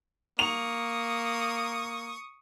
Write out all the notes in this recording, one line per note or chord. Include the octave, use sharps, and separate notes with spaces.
A#3 C#6 D#6 F7